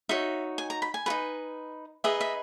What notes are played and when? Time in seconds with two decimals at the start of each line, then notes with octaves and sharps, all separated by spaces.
0.09 D#4 F#4 C#5 E5
0.58 G#5
0.70 A#5
0.82 B5
0.94 G#5
1.06 F#4 B4
1.10 D#4
2.04 D#4 G#4 B4 D#5 E5
2.21 E5